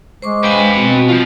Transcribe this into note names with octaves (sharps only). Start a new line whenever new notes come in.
G#3 C5 C#6 D6
B4 C5 F5 G5 G#5
B2 C4 F#4
F3 F4